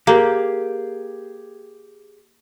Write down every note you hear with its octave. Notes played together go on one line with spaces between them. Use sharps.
A#3 G4 G#4